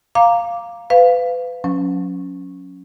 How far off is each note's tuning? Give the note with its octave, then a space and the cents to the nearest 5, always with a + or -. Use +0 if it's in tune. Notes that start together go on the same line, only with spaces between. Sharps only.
F5 +0 A#5 +0 D6 -5
B4 +30 F5 +0
F#3 -30 C#4 +0